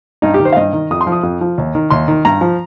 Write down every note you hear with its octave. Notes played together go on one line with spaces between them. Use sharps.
G2 D#4
G4
D#3
C5
F5
G2 D#5
D#3
F2 D#6
C6
F3
D#6
F2
F3
D#2
D#3
D#2 C6
D#3
G2 A#5
F3